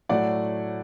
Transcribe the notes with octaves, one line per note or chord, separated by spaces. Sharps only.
A2 F#3 A3 D5 F#5